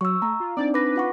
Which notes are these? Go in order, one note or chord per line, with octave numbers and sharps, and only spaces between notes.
F#3 C#6 E6
A3 A#5
F4
C4 D4 D#4 D5
B4 D6 A#6
F4 F#5 C#6